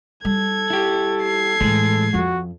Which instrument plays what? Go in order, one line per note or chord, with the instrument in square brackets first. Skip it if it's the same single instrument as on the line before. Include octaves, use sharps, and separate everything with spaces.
[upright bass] G3 [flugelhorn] A4 [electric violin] G#6
[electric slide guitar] E4 G4
[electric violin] G#6 C7
[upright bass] A2 E3 [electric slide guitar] G#3
[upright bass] F2 [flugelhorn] F#4